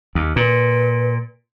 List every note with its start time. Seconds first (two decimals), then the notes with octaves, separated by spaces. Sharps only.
0.15 D#2
0.36 A#2 B4